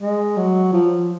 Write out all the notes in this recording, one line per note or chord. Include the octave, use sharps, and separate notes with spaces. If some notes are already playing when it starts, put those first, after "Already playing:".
G#3
F#3
F3